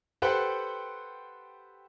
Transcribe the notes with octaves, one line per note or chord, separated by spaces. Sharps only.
G4 A4 B4 C5 F#5 G5